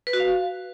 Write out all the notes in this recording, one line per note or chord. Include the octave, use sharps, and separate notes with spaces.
B4
F#4
F5